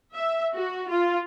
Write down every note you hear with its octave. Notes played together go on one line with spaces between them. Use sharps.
E5
F#4
F4